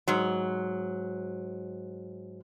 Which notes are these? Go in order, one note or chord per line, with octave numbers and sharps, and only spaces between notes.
G#2 F#3